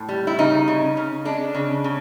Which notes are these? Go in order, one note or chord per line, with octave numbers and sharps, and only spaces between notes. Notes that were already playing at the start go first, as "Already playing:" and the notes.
Already playing: A2
G3
E4
C#3 D#4
C#3
C#3
G#3 D4
C#3
C#3